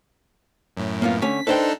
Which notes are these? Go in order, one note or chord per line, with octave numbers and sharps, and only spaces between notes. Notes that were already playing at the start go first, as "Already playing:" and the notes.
F#2 A2
A#3 B3 F4
D3 A3 C#4 B6
D4 D#4 A4 B4 C5 G5